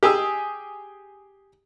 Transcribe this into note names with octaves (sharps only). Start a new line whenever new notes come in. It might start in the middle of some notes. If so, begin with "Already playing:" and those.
G4 G#4 G#5 E6